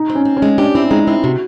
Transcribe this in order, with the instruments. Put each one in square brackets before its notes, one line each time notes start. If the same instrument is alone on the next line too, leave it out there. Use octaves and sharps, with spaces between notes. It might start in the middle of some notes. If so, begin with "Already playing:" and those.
Already playing: [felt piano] D#4
[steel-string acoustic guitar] C4
[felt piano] C#4
[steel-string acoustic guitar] C4
[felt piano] C#4
[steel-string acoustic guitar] G#3
[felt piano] D4 [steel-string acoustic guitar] G4
[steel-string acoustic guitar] C4 [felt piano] E4
[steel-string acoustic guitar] G#3 [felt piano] D#4
[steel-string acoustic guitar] C4 [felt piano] E4
[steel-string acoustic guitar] C3 [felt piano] F#4